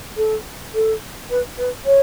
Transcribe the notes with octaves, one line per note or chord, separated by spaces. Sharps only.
A4
A4
B4
B4
C#5